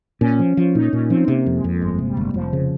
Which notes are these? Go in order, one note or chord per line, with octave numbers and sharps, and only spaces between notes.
A#2 C#4
F3
F3
A#2 D#4
A#2 C#4
F3 C4
C3 A#3
F2
G#3
F2
G1 G#3
C3
G3
G1
F1 F3
C#3